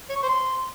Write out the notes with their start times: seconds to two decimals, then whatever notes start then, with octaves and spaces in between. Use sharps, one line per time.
0.09 C#5
0.16 C#6
0.23 C5
0.29 C6